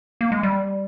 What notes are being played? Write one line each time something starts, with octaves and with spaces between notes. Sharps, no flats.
A#3
G#3
G3